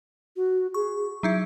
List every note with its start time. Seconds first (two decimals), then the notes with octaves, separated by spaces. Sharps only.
0.36 F#4
0.74 G#4 C#6
1.23 F#3 D#4 E4 E5